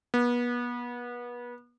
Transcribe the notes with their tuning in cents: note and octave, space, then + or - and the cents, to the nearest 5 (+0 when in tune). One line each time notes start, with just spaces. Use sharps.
B3 -30